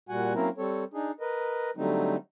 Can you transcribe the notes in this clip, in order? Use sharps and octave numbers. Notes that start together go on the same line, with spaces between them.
A#2 G3 F#4 F#5 G#5
F#3 A#3 C4 C#4 E4 A#4
G3 C4 A4 C#5
D4 D#4 G#4
A#4 B4 D#5
D3 F#3 G3 A3 C4 D#4